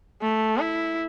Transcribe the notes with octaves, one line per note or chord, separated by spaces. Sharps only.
A3
E4